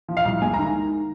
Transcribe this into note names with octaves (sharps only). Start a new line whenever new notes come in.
F3
F5
C2
G#3 G#5
A#5
D#3